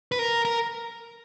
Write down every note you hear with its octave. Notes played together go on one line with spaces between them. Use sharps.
B4
A#4
A#4